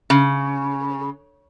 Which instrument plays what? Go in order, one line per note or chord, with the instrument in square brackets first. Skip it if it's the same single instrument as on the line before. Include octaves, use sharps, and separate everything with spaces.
[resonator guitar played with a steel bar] C#3